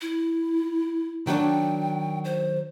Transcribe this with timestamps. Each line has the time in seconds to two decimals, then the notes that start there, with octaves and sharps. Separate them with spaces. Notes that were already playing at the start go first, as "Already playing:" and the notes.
0.01 E4
1.27 D#3 F#3 D4 G5
2.25 C5